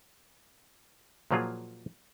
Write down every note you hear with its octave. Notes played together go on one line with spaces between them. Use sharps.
A#2 F3 F#3 A#3 F4 G#4